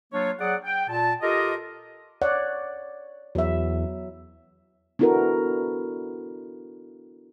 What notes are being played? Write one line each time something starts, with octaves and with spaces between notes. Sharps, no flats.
F#3 A#3 D4 F4 C#5
F#3 G#4 D5 F#5
G5
A#2 A5
F4 G4 A4 A#4 D#5
C#5 D5 F#5
E2 F#3 E5
B3 D4 E4 F#4 A4 A#4